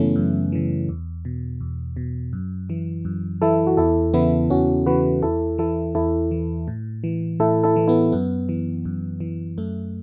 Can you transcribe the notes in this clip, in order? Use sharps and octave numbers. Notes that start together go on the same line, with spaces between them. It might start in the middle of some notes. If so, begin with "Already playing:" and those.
Already playing: F#2 C#3 E3 A3 B3 C#4 E4
F#2
C#3 E3
E2
B2
E2
B2
F#2
E3
F#2
E3 E4 A4
F#4
E2 E4 A4
C#3 E3 B3 E4
E2 C#4 F#4
C#3 E3 F#4 B4
E2 E4 A4
E3 E4 A4
E2 E4 A4
E3
A2
E3
A2 E4 A4
E4 A4
E3
B3 E4
F#2 B3
E3
F#2
E3
F#2 A3